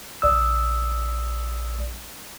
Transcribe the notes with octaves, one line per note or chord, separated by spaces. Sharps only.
A#1 D5 D#6 E6